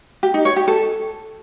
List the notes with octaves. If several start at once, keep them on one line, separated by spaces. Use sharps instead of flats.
G4
D#4
C#5
G4
A4